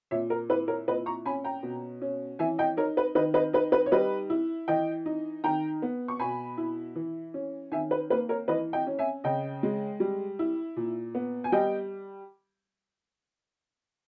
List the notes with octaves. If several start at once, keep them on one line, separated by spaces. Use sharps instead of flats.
A#2 C#5 E5
A#4
E4 B4
A#4 C#5
A#2 B4 D#5
A#5 C#6
C#4 G#5 B5
G5 A#5
B2
C#4
E3 E5 G#5
D#5 G5
D#4 A#4 C#5
B4
D#3 B4 D#5
B4 D#5
D#4 B4
B4
C#5
G3 B4 D#5
E4
E3 D#5 G5
D#4
D#3 G5 A#5
B3
C#6
B2 G#5 B5
E4
E3
C#4
D#3 E5 G#5
B4
A#3 B4
A#4 C#5
E3 B4 D#5
D#5 G5
C#4
E5 G#5
C#3 D#5 G5
G#3
G3
E4
A#2
B3
G#5
G3 D#5 G5